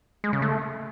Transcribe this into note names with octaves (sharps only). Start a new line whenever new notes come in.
G#3
C#3
A3